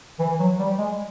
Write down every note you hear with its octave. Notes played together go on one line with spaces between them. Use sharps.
E3
F#3
G3
G#3